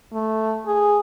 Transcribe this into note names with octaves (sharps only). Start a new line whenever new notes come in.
A3
G#4